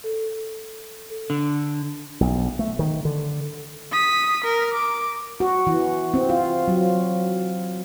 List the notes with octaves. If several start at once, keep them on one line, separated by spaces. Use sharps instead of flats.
A4
D3
B1
A3
D#3
D3
D#6 B6
A#4
D6
F#4
E3
C4
F4
F#3